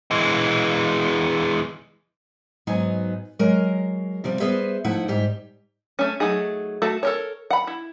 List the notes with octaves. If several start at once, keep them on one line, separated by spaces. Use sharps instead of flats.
E3 G#3
G#2 F#3 B3 D#4 G#5
F#3 G#3 A#4
C3 F3 G3 C4
G3 B3 G#4 B4 C5 E5
F3 A3 D#4 E4 F#5
G#2 G3 G4
A3 C#4
F#3 A3 D#4 G#4
A3 F#4 A4
A4 A#4 C#5
F#5 B5
E4